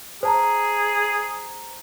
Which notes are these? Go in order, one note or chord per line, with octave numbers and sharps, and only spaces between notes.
G#4 C5 A5 A#5